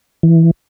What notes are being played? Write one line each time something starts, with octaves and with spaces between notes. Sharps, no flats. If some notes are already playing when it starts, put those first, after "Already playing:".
E3